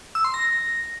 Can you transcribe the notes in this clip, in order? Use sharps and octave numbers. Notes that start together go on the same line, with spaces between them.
E6
C6
A#6